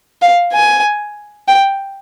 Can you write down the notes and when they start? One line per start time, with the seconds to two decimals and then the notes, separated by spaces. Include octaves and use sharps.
0.22 F5
0.53 G#5
1.48 G5